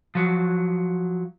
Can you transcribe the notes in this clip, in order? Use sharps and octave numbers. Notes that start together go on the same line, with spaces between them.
F3 F#3